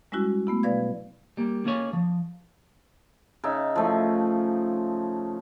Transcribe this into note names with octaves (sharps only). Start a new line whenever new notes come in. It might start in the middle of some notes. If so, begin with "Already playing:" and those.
G3 G#3 C#4 E4 F#4
A3 B3 E4
B2 F#3 B4 D5 F5 G#6
G3 A#3
A#3 C#4 F4 G#4 C#5
F3
C#3 D#4 E5
F3 A3